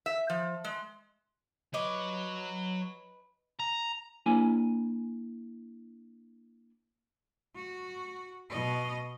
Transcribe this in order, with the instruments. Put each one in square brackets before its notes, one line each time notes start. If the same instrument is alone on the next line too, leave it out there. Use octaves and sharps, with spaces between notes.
[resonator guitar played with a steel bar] E5
F3
G#3
[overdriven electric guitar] F#3 C#5 [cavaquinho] B4 D#5 D6
[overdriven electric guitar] A#5
[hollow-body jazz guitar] A#3 D4 E4 G#5
[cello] F#4
B2 D#5